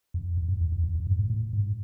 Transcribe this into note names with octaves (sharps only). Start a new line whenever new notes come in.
F2
F2
F#2
F2
E2
F2
F2
G2
A2
A2
G#2